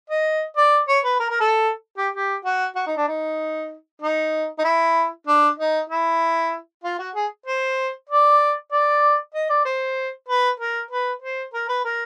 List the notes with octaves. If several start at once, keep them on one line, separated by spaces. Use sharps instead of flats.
D#5
D5
C#5
B4
A#4
A#4
A4
G4
G4
F#4
F#4
D#4
D4
D#4
D#4
D#4
E4
D4
D#4
E4
F4
F#4
G#4
C5
D5
D5
D#5
D5
C5
B4
A#4
B4
C5
A#4
B4
A#4